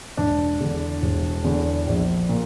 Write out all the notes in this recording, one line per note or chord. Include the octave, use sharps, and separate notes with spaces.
E1 D4
E2 D3
E1
E2 D3
A#1
A#2 A#3